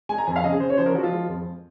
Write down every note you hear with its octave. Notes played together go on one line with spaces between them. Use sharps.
G#3 G#5
A#5
F2 G#5
F5
C#3 D#5
G#4
C#3 C5
C#5
F3 C5
A#4
F3 F#4
F4
G#3
F2